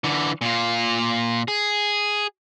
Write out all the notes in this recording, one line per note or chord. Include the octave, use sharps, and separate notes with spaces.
D3 E3
A#2 F4
G#4